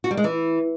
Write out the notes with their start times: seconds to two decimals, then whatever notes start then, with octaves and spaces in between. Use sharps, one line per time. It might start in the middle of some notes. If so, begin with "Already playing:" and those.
0.04 F#4
0.11 G3
0.17 G#3
0.24 E3